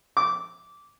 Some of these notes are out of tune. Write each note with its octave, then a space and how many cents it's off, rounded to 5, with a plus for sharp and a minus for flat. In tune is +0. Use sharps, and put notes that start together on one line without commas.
D6 -15